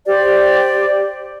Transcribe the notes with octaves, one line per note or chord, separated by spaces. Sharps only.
G4 C5 D5